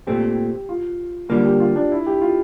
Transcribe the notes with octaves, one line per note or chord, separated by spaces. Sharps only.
A#2 A3 C4 G4
F4
D3 G3 A#3 F4
G4
F4
D4
E4
G4
F4